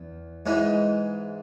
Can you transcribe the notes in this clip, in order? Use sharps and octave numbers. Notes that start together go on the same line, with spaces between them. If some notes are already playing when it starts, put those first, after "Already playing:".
Already playing: E2
G#2 E3 G#3